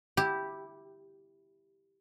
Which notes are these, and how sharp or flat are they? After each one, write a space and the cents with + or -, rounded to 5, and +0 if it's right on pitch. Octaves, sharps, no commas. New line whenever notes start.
E4 -5 G4 +0